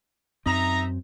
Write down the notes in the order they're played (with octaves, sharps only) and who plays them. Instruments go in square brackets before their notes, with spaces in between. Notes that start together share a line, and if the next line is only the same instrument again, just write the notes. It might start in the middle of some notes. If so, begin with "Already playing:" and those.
[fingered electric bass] F#2 C4 [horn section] D#4 E5 A#5